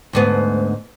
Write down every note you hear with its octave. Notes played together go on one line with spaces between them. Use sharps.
D2 G#2 B3